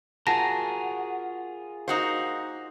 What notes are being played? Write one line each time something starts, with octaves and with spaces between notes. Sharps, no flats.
F4 F#4 G#4 A#4 A5 A#6
A#3 D#4 F#4 C5